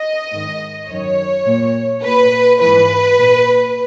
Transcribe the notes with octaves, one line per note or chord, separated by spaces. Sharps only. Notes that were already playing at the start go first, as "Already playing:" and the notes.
Already playing: D#5
G#2 D#3
F#2 D#3 C#5
A#2
A#2 B4
G#2 E3 B4
A#2